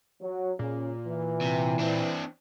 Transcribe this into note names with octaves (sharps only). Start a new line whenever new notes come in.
F#3
A#2 C#3
E3
C3
C4 D4